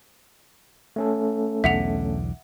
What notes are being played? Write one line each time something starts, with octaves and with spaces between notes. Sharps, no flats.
A3 C#4 A4
B1 E2 D3 E5 F#5 F7